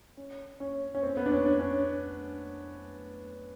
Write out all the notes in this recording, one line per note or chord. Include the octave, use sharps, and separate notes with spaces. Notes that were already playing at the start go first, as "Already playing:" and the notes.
C#4
C#4
C#4
C4
B3
D4
C#4
D4
C#4